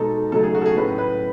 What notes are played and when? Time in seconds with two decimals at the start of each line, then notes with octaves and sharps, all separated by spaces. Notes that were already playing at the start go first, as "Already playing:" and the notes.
Already playing: B2 G#3 D#4 A4
0.32 C#3 F#3 A3 D#4 A4
0.43 G#4
0.55 F#4
0.61 A4
0.66 G#4
0.77 A2 F#3 C#4 B4
0.98 B4